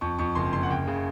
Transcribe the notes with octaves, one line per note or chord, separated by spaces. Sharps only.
F2 C#6
F2 C#6
F#1 C6
F#1 C6
F#5
F#1 G5
C#3